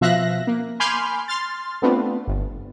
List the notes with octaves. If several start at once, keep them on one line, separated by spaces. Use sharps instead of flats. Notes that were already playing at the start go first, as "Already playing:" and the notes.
B2 F3 E5 F5 F#6 A#6
A#3
G#5 B5 C6 D6 F6 G6
C6 F6 A6
A3 B3 C4 D4 F4
G1